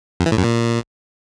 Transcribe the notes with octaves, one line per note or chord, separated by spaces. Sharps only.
F2
E3
A2
F#2
A#2